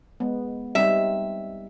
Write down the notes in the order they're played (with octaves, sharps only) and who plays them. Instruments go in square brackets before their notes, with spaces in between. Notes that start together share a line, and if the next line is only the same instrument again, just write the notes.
[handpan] G#3 B3
[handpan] G3 C4 D#4 [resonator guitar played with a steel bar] E5